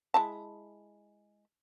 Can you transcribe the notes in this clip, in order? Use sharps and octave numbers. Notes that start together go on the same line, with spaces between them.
G#3 E4 A5